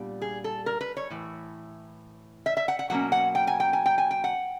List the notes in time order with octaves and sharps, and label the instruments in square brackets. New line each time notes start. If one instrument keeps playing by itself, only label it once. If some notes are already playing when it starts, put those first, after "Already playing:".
Already playing: [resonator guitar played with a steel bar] A#2 G3 B3 D4
G#4
A4
A#4
B4
C#5
A2 E3
E5
E5
F#5
F#5
B2 F#3 A#3 C#4 F#5
F#5
G5
G#5
G5
G#5
G5
G#5
G5
F#5